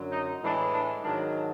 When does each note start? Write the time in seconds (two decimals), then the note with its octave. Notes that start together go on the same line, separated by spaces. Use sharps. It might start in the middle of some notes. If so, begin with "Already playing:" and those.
Already playing: F#2 D3 F#3
0.12 D#4
0.42 A2 E3 G#3 D4
0.72 D4
1.03 G#2 D#3 F#3 D4